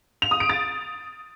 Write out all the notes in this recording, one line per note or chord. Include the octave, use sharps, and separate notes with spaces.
F7
D#6
D7
A6